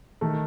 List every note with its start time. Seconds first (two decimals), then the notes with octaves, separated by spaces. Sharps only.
0.21 D#3 A3